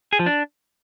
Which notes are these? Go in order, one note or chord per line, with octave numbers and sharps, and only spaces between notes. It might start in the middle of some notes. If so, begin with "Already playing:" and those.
G#4
F3
D4